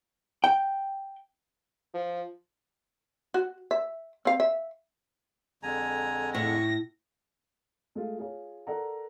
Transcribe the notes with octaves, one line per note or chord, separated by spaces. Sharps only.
G5
F3
F#4
E5
C4 F5
E5
F2 D3 G#3 G#5 A#5
A2 C#6 A#6
G#3 A3 F4
F4 G#4 C#5
A4 A#4 D5 F#5 A#5